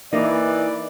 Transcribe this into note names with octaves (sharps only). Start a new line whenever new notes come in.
E3 A#3 D#4 D5